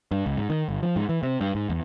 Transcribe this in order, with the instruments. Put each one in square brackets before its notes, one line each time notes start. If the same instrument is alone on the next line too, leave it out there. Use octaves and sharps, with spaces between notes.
[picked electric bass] G2
C#2
G#2
D#3
G1
F3
G#2
E3
C3
G2
G#2
E2